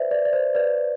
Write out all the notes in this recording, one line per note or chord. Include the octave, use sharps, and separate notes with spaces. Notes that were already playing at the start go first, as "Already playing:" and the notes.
Already playing: B4 C5 D5 E5
B4 D5
D5
C5
B4 D5